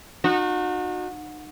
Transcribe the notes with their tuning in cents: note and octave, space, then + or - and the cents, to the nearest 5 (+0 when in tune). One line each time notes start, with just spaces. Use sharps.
D#4 -35 F#4 -30